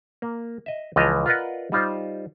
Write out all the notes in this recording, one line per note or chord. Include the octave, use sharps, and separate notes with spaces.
A#3
D#5 E5
C#2 E3 F3 D#5 A5 A#5
F4 A#4 B4 D5 D#5 F#5
G3 D#4 F4 C5